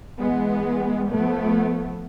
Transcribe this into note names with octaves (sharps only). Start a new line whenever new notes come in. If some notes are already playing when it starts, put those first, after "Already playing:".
E3 G#3 B3
F3 A3 B3